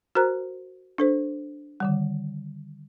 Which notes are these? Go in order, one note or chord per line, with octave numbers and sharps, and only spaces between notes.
F#4 A#4 C5 A#5 F#6
D4 A4 C5
D3 D#3 G3